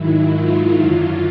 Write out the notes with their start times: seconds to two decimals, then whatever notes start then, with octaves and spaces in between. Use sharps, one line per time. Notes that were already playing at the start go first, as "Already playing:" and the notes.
Already playing: G#2 D#3 F#3 E4
0.37 F4
0.81 F#2 D3 F#3 F4